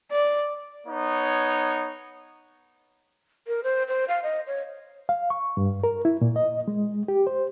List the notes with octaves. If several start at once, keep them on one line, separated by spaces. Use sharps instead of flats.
D5
B3 D#4 C#5
A#4
C5
C5
F5
D#5
C#5
F5
C#6
G2
A#4
E4
A#2
D#5
G#3
G4
C5